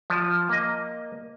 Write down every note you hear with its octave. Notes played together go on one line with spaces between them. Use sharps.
F3
A#3 D#5